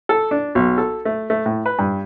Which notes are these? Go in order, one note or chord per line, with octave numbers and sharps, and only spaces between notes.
A4
D4
B1
A4
A3
A3
A2
B4
G2